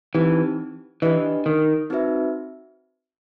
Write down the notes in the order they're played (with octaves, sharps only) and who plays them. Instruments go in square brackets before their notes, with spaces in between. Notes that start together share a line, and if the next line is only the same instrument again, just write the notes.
[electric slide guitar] E3 [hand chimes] C4 D#4 G4
[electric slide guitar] E3 [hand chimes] D4 G4 B4 D#5
[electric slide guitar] D#3
[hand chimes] C4 D#4 F#4 B4 E5